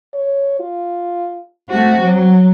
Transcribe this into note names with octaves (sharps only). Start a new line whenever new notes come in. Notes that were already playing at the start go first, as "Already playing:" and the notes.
C#5
F4
A3 C4 F#4
F#3